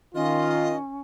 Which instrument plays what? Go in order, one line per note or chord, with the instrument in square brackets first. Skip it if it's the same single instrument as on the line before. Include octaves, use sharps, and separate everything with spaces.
[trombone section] D#3 F4 [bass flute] C#4 [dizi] D#5